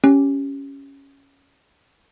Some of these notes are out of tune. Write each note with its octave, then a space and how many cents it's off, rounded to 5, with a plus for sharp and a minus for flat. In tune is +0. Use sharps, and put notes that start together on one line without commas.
C#4 +0 G4 +0